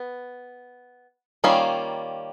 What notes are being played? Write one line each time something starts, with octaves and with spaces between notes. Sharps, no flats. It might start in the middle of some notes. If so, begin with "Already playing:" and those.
Already playing: B3
D#3 G3 A#3 C#4 F4